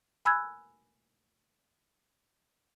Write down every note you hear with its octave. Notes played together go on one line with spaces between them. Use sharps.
G#5 B5 E6 F#6 G#6